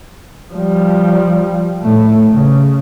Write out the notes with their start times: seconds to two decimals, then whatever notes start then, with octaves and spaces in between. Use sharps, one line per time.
0.53 F3 G3
1.83 A2 A3
2.31 C#3